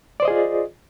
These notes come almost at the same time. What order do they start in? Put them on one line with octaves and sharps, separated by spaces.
D5 C5 D#5 G#4 F4